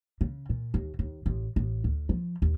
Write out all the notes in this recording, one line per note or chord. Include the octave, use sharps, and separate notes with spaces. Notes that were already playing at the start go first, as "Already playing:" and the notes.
C#3
A#2
D#2
D#2
A1
A1
D2
F3
D#2